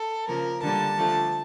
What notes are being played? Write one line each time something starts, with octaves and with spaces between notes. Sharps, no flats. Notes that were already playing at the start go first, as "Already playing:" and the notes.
Already playing: A4
C#3 F3 A#3 A#4
D3 G3 A#3 A5
D3 F3 A3